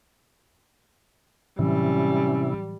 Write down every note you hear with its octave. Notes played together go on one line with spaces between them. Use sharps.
A2 C3 E3 F#3 G3 C#4 E4